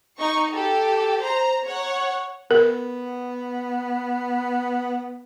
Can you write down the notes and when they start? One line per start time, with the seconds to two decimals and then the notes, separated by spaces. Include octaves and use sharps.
0.19 D#4 C#6
0.51 G4 A4
1.22 C5 A#5
1.64 C#5 F#5
2.51 B3 A#4